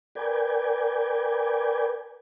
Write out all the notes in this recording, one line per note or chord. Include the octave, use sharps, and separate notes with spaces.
A#4 B4 D5 G5 G#5